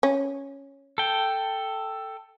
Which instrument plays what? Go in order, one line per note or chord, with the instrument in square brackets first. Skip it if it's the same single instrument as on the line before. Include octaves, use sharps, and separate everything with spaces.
[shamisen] C#4
[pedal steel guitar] A4 G5